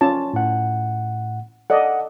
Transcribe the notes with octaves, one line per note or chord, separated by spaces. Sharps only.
C#4 F4 A5
A2 F#5
A4 D5 D#5 F#5